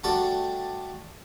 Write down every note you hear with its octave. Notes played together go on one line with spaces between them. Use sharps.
G3 A3 D4 F#4 G4 A4